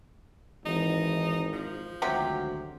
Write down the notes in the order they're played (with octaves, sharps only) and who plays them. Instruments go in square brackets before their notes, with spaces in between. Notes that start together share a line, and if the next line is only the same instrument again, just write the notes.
[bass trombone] G#1 [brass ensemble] E3 [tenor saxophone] D#4
[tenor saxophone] F3
[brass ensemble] G#1 D2 F#4 [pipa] C3 F#3 G4